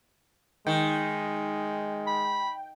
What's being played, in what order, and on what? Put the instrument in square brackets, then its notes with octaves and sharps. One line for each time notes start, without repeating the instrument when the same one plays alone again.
[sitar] D#3 [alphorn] G#3 [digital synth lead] G5
[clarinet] B5